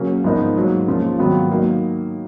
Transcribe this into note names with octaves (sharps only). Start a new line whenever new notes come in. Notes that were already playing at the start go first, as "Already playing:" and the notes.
Already playing: C#3 F#3 A#3 C#4
G#2 F3 B3 D#4 A#4
G#2 F#3 A#3
C#3 F3 A#3 F4
G#2 D#3 F#3 B3 F4
F#3 A#3 D#4